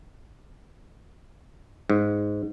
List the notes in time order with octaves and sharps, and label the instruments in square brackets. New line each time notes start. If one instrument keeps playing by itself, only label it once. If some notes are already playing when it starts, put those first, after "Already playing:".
[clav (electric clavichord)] G#2